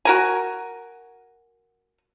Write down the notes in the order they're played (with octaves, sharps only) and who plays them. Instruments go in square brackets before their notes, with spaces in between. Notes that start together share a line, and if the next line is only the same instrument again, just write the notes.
[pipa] F#4 A#4 G#5